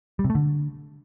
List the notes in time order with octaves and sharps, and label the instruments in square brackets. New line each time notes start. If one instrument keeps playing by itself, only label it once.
[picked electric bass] G3
C3
A3
D3